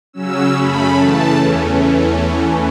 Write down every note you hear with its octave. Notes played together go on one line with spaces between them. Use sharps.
C#3 F#3 C#4 E6
F#2 C#3 A3 C#4 B5
C#3 E3 A3 A5
E2 E3 A3 C#4